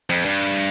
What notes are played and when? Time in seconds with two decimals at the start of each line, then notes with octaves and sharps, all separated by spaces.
0.10 F2
0.25 G2